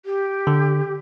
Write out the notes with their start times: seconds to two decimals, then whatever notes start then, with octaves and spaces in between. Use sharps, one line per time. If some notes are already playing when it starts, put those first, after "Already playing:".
0.05 G4
0.47 D3